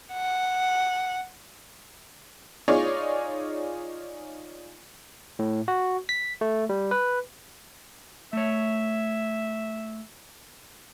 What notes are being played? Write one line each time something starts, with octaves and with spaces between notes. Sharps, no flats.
F#5
D#4 F4 G#4 C#5 D5
A2
F#4
B6
A3
G3
B4
A3 C#5 E5